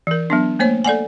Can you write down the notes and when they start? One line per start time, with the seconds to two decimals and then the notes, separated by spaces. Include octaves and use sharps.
0.07 E3 A#4
0.30 F#3 B3 D4
0.59 A3 A#3 C5 C#5
0.84 A4 D5 F#5 G#5